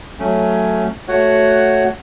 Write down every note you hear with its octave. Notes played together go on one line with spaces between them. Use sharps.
F#3 A3 C#4
A3 F#4 C#5 F#5